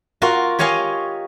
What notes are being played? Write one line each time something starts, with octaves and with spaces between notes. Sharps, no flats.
F4 F#4 A#4 F5
G4 C#5 D#5 F5 G#5